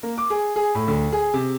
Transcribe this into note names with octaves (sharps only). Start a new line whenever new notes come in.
A#3
D6
G#4
G#4
A2
D2
G#4
C3